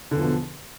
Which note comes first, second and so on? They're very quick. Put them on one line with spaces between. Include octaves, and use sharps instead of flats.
D3 E2 F3 B2